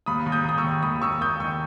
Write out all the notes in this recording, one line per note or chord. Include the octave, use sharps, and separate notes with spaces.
D#2 B5 D#6
D#2
D#6 G6
D#2 D#6
C#6 E6
D#3
D#2 B5 D#6
A#3 C#6 E6
A#3 D#6 G6
D#3 C#6 E6